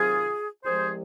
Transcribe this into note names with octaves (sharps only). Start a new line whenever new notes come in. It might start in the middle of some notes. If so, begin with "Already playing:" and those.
Already playing: C3 D#3 F#3 C4 F4 G#4
C2 C3 F3 G#3 G#4 C5